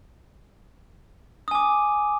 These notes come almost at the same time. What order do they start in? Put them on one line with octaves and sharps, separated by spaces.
D#6 G#5 D6